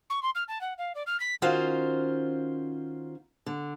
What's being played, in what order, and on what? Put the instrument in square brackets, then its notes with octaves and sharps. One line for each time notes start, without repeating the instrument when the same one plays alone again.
[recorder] C#6
C6
F6
A5
F#5
F5
D5
F6
B6
[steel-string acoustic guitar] D#3 C#4 F4 F#4 C5 F5
D3